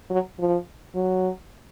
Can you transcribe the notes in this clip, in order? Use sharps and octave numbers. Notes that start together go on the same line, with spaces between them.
F#3
F3
F#3